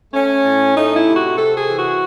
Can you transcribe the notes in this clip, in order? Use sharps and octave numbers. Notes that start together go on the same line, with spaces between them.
A3 C#4
A2
A3 D#4
E4
C3
F#4
C3 A4
G#4
E3
F#4